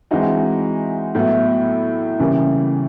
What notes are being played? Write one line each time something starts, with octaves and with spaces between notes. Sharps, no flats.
E3 G#3 C4 D#4 F#4
A2 F#3 B3 E4
C#3 E3 G3 A#3 C#4